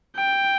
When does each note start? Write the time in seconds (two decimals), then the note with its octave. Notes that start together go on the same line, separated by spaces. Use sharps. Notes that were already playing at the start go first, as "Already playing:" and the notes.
0.17 G5